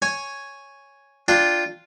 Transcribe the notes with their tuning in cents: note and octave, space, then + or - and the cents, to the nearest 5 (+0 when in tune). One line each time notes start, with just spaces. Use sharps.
C#5 +0 G#5 +0
D4 +0 F4 +0 G5 +0